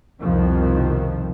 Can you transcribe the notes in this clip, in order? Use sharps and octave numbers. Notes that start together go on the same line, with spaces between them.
C2 F2 B2 D#3 F3